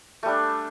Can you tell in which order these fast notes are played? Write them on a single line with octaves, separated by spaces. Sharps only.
A3 G3 D4